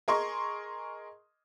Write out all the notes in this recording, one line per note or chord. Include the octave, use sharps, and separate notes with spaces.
G#4 A#4 D#5 C6 C#6